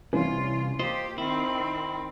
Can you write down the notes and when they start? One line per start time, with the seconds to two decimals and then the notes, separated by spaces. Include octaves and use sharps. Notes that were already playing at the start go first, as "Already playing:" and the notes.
0.13 C2 C3 E3 C#4 F4
0.79 A#3 F4 G4 C5 D#5 C6
1.18 D#3 C4 E4